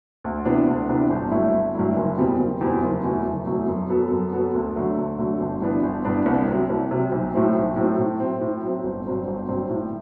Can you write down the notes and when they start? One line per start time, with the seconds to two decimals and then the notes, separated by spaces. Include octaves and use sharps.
0.24 D2
0.45 C3 E3 B3 D4
0.67 D2
0.89 C3 E3 B3 D4
1.10 G1
1.31 G2 F#3 A3 E4
1.53 G1
1.75 G2 F#3 A3 E4
1.96 F#1
2.17 E2 B2 G3 C4
2.39 F#1
2.61 E2 B2 G3 C4
2.82 F#1
3.04 E2 B2 F#3 A3
3.26 F#1
3.46 E2 B2 F#3 A3
3.68 F#2
3.89 F#3 B3 F#4 A4
4.11 F#2
4.33 F#3 B3 F#4 A4
4.55 D2
4.76 D3 F#3 A3
4.98 D2
5.19 D3 F#3 A3
5.40 G1
5.62 G2 E3 B3 D4
5.83 G1
6.05 G2 E3 B3 D4
6.26 C2
6.48 C3 F#3
6.70 C2
6.91 C3 F#3
7.12 B1
7.34 A2 F#3 A3 C4
7.55 B1
7.76 A2 F#3 A3 C4
7.98 A2
8.20 F#3 C4
8.41 A2
8.63 F#3 C4
8.84 G1
9.06 G2 F#3 C4
9.27 G1
9.48 G2 F#3 C4
9.69 A2